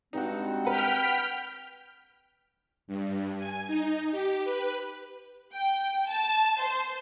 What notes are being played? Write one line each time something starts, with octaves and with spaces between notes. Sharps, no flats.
G2 G#3 C4 D#4 F#4
B4 F#5 G5 F6 B6
G2
G#5
D#4
G4
B4
G5
A5
C5